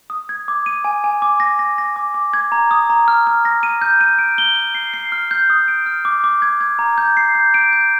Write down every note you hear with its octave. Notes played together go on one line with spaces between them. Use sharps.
D#6
G#6
D6
D#7
G#5
G#5
D6
A#6
A#6
A#6
D6
D6
G#6
A#5
D#6
A#5
F6
F6
A#6
D#7
G6
D#7
D7
G7
G7
C7
C7
F6
G6
D#6
D7
F6
D6
D6
G#6
G#6
A#5
G6
C7
G6
D7
G6